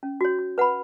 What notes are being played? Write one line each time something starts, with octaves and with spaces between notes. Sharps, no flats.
C#4
F#4 C#5
F#4
B4 F#5 B5